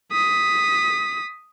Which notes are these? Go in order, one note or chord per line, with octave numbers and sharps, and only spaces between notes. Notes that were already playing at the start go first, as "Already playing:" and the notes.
D#6 B6